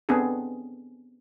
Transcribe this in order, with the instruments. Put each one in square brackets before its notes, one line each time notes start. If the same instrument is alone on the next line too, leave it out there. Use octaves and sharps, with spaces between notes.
[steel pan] B3 C4 D4 G#4 A4